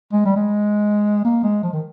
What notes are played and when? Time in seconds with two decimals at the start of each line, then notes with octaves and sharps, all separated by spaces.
0.13 G#3
0.26 G3
0.36 G#3
1.25 A#3
1.43 G#3
1.63 F3
1.73 D#3